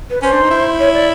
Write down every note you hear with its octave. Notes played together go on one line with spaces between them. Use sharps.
B4
C#4 C5
D4
D#4
E4
C#5
D5